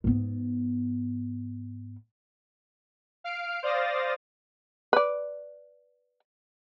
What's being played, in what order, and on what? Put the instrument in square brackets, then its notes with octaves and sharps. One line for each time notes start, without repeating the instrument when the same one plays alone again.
[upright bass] G#2 B3
[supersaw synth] F5 F6 C7 D7
C5 D5 F5 D#6 A6 A#6
[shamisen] B4 D5